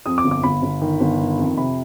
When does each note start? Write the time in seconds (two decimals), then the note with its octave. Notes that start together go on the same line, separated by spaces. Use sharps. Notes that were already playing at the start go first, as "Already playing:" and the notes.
0.06 F2 D#6
0.18 D6
0.24 G1
0.31 D6
0.44 G1 B5
0.62 G1
0.82 D#3
1.00 G1
1.19 D#3
1.39 F2
1.57 C3 B5